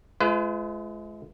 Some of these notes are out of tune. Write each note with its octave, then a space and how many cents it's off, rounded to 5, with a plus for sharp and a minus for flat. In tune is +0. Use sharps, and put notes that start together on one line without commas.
G#3 +35 F4 -25 B4 +45